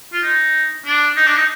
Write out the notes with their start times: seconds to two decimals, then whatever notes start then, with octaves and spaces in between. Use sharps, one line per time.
0.13 F4
0.22 D#4
0.86 D4
1.16 D#4
1.27 D4
1.37 D#4